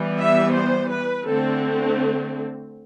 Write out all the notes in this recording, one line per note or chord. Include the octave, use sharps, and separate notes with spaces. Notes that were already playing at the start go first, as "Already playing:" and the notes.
Already playing: E3 G3 B3
E5
C5
B4
D3 A3 C4 A4